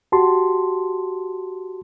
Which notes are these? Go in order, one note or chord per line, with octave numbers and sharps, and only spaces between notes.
F#4 G4 A5 C6